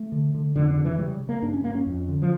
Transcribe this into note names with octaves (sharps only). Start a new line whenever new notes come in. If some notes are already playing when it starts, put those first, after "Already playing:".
Already playing: A3
D3
D3
F2 D3
D3
C#3
E3
C#3 G3
C#3
A#3
G2 D4
C#4
G2 A#3
C#4
F2
D3
F3